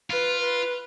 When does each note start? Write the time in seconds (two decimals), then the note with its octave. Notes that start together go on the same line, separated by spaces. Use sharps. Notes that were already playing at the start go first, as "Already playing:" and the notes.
0.10 F4 B4
0.41 B4